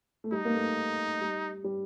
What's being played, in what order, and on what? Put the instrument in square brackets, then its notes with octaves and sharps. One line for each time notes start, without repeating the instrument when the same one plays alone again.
[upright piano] A3
[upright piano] G3 [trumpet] D#4
[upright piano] A#3
A3
G3
G3